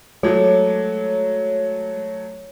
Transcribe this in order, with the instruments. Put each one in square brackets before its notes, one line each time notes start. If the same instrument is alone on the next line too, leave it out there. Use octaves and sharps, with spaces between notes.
[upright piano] F#3 A3 [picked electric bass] G#3 [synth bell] C#5